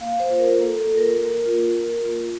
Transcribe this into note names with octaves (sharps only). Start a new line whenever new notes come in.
A#3 F5
C5
F4
A#4
A#3 A4
A4
F4
A#4
A#3 A#4
F4
A#3
F4